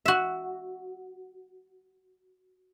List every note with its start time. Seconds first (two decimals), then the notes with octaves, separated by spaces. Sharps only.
0.06 F#4 E5